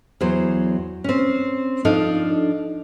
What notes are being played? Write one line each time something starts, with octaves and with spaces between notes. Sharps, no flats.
E2 F#3 C5
C4 C#4
F3 D4 D#4 A4 F5